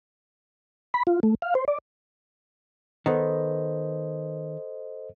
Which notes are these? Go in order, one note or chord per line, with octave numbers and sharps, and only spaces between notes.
B5
F4
A3
F5
C5
D5
D#3 B3 A4 C5 D#5